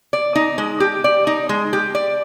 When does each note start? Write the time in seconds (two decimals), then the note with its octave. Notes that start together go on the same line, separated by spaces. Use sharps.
0.13 D5
0.35 D#4
0.58 G#3
0.80 G4
1.04 D5
1.27 D#4
1.49 G#3
1.73 G4
1.95 D5